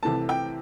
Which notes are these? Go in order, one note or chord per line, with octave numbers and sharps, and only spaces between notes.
C2 C3 E3 A3 A5
G5